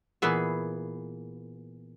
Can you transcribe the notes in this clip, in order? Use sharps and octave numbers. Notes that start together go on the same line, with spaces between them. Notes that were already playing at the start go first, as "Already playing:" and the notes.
A#2 E3 B3 G#4 E5